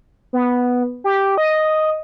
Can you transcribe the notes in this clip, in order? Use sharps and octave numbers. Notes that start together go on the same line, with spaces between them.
B3
G4
D#5